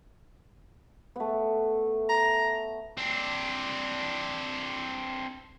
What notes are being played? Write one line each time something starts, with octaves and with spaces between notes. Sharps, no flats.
A3 B3
A#5
C4 D4